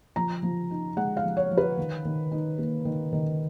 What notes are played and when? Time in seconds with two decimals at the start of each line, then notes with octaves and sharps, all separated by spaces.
0.16 F3 A#5
0.43 F3
0.71 D#4
0.97 G#3 F#5
1.17 F5
1.24 F3
1.37 C#5
1.51 F3
1.57 B4
1.77 D#3
2.05 D#3
2.32 D#4
2.58 A#3
2.85 D#3
3.13 D#3